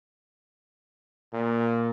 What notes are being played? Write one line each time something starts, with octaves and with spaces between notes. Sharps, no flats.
A#2